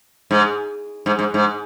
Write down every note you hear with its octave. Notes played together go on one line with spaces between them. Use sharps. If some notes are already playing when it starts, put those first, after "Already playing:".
G#2
G#2
G#2
G#2